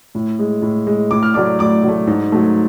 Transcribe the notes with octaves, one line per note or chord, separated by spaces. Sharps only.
A2
G#3
A2
G#3
A2 D6
F6
F#3 A3 D5 D6
A2 D5 D6
F#3 A3
G#2
F#3 A3